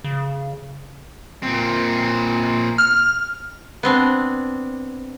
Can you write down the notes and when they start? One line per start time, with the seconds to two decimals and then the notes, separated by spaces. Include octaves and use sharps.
0.04 C#3
1.43 A#2 C4
2.78 F6
3.83 B3 C4 D4